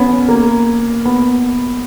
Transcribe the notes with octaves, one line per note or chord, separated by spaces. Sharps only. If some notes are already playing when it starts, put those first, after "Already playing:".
Already playing: B3 C#4
A#3
B3